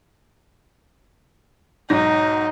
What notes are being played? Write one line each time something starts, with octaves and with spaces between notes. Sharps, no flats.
B1 G#2 D#4 A#6